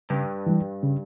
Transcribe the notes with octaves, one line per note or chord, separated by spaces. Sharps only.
G2 C#3
E3 G3
C#3